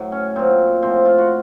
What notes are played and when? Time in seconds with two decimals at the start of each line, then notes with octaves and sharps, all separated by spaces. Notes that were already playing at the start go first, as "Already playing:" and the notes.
Already playing: A2 F#3
0.12 C#4
0.36 A#2 F#3 C4
0.82 A2 F3 C4
1.05 F4
1.18 F#4